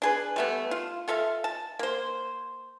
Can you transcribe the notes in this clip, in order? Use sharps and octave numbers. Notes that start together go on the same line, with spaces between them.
D4 G#4 B4
G3 A3 B3
F4
F4 A4 E5 F5
A5
A#3 C5